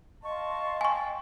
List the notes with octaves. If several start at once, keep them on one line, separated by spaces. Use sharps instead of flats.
D#5 F5 A5 C6 C#6
G5 G#5 C#6